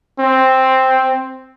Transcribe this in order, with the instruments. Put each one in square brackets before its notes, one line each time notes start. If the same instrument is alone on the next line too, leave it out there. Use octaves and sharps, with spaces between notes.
[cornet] C4